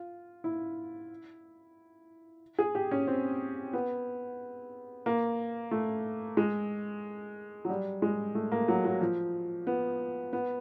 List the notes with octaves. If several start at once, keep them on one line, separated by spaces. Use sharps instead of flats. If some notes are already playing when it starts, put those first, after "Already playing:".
Already playing: F4
E4
G#4
G4
C#4
C4
B3
A#3
A3
G#3
F#3
G3
G#3
A3
A#3
F#3
F#3
F3
B3
B3